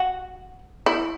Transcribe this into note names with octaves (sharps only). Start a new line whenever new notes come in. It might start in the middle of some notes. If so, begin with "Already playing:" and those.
Already playing: F#4
E4